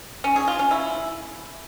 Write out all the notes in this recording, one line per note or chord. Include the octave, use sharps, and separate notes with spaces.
C#4
G#4
F4
C#4
E4